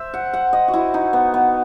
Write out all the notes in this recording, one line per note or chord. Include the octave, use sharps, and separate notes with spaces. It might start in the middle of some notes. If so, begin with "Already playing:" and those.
Already playing: C5 E5
F#5
F#5
D#5
F#4
E4
D#4
B3
B3